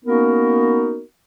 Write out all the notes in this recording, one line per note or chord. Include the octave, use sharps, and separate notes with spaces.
A#3 B3 C#4 D#4 F#4 A#4